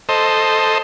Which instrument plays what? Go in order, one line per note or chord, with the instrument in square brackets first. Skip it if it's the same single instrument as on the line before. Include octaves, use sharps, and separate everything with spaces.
[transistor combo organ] A4 C5 D#5